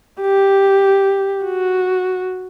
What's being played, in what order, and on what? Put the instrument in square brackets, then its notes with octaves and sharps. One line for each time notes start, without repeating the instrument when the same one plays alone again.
[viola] G4
F#4